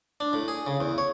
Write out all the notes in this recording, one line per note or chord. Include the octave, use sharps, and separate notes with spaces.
D4
A2
G#4
C#3
E2
C#5